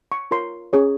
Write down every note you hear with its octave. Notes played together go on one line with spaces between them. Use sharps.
C#6
F4 A#4 C#5 C6
C#4 G#4 C#5